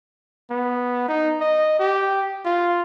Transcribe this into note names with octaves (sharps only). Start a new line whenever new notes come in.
B3
D#4
D#5
G4
F4